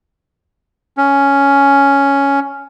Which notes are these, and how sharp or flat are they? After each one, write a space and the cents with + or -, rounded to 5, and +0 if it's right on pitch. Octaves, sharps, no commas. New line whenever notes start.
C#4 +5